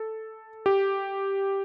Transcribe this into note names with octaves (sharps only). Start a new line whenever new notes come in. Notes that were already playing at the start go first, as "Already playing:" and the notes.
Already playing: A4
G4